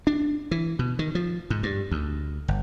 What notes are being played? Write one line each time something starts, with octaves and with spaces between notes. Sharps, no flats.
D4
E3
B2
D#3
F3
G#2
G2
D2
G1